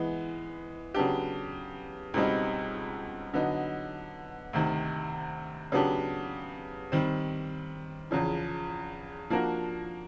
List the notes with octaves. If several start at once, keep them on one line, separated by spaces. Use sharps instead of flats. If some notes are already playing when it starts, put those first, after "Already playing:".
Already playing: E3 G#3 B3
C#3 F#3 B3 D4 G4
C#2 B2 G3 C4 D#4
D3 F#3 B3 D#4
D2 C3 D#3
C#3 F#3 B3 D4 G4
D#3 G3 C4
E2 C#3 F3
F3 A#3 D4 F#4 A#4